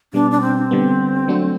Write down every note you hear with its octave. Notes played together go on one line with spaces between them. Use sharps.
B2 G3 B3 D4
D4
C4
D3 G3 B3
F#3 A3 D4 F#4